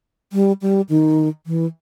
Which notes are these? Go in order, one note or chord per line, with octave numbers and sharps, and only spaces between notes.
G3
G3
D#3
E3